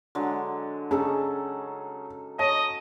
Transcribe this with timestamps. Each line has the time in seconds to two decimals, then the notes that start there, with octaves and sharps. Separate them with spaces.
0.15 D3 F#3 G#3
0.91 C#3 C#4 D#4 G#4 A4
2.39 C#5 D#5 A5